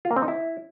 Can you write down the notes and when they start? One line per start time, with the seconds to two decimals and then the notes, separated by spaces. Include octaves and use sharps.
0.05 F4
0.11 A#3
0.16 C4
0.22 D#4
0.28 E4